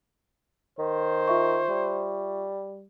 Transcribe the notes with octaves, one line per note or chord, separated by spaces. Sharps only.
D#3 C5
F4 E5 C#6
G3